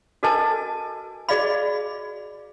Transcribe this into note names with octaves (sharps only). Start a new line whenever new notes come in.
F#4 A4 A#4 D#5 G#5 A5
F#4 G#4 D5 D#5 F5 B5